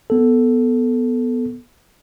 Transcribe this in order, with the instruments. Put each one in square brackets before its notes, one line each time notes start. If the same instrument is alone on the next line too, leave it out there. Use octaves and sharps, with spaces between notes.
[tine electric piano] B3 A4